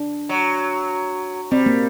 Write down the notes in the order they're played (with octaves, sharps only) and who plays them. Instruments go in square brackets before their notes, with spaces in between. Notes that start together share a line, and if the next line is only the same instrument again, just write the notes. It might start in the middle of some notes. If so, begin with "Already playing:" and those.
Already playing: [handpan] D4
[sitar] F#3
[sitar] G3 [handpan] C4
[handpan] A#3